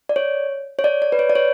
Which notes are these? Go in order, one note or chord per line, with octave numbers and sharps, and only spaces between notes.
D5
C#5
C#5
D5
D5
B4
C#5
D5
C#5